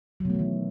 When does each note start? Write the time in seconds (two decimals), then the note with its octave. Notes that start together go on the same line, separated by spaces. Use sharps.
0.20 F#3
0.25 B2
0.30 A3
0.34 E3
0.39 D#3